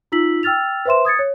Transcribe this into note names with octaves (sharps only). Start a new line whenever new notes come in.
D#4 F4 E6 B6 F#7
G5 E6 F6 A6 F7
B4 C5 E5 C6 E7
D#6 G#6 A6 C#7
C#5